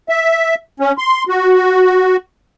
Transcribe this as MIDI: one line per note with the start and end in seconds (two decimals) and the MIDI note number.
0.09 0.55 76
0.80 0.92 61
0.98 1.24 84
1.29 2.16 66